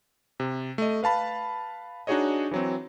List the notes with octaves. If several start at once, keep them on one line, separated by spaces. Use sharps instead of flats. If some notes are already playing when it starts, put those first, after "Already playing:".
C3
A3 D#5
B4 F5 A5 B5
D4 D#4 F#4 G#4 C#5 D#5
E3 F#3 C4